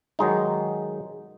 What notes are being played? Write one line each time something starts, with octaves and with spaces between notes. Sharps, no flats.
D#3 F#3 G#3 D#4